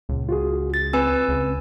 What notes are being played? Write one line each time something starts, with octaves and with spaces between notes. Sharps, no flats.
C#2 A#2
F4 F#4 G#4
A6
C4 B4 G#5 E6
C#2